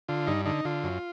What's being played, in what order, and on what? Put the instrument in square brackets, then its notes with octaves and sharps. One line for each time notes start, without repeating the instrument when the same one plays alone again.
[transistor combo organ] D3 F4
G2 D#4
D3 D#4
D3 F4
F#2